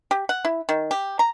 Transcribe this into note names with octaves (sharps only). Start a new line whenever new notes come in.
G4
F#5
E4
D#3
G4
A#5